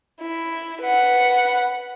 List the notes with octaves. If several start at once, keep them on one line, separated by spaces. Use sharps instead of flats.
E4
B4 F#5